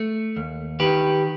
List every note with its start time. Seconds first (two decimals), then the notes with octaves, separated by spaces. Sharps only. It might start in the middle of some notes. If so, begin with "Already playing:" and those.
Already playing: A3
0.36 D#2
0.80 D#3 G4 B4